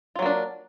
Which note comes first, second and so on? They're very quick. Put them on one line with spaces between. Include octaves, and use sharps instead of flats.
F4 F#3 A#3 D4